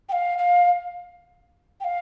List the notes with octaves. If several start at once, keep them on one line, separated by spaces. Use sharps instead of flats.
G5
F5
F5
G5
F5